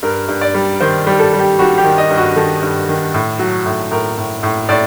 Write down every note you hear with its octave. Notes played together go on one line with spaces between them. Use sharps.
G2 A#4
G2
D5
G3
D#3 C5
G3
A4
G3
G4
G3 F#4
G4
D#3
D#5
G2
F#4
D#3 A4
G2
D#3
A2
F#3
A2
A2 A#4
A2
A2
A2 D5